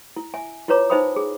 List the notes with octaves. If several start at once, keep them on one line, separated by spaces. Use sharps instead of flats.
E4
E5 G#5
E4 F4 B4 C#5 A#5 D6
D#4 C5 E5 G5 B5 D#6
G#4